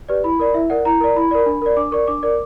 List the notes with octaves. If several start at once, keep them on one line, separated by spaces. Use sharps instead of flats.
G4 B4 D5
E4 B5
A#4 D5
E4 E5
A#4 D5 F#5
E4 A#5
A#4 D5
E4 B5
A#4 D5
D4
A#4 D5
D4 D6
A#4 D5 C#6
D4 D6
A#4 D5